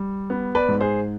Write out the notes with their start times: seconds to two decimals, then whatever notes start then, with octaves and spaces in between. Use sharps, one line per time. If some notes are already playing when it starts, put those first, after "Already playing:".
Already playing: G3
0.30 B3
0.55 B4 D5
0.68 G#2
0.81 G#4 C5